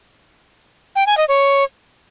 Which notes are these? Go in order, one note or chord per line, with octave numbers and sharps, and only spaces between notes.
G5
G#5
D#5
C#5